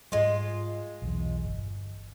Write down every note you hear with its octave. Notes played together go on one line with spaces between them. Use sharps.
G#2 G3 G#3 F4
B1 E2
G1